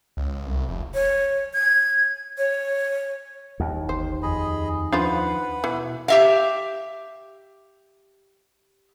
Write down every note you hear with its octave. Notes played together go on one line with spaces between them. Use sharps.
C#2
C2
F1
C#5
G#6
C#5
D#2
G1 C5
F2 G#4 D#5 B5
F3 D4 F4 B4 C5 F#5 B5
B2 E3
G4 E5 F5